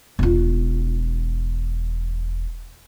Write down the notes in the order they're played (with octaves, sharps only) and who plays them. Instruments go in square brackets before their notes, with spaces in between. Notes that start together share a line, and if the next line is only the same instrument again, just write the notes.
[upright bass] E1 F4